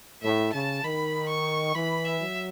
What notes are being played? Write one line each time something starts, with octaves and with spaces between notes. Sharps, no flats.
A2 E5
C#3 A5
D#3 B5
C#6
E3 B5
E5
F#3